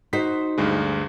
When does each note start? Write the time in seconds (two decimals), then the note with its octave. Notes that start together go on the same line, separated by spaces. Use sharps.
0.13 D#4 F#4 C5 B6
0.58 D2 G2 G#3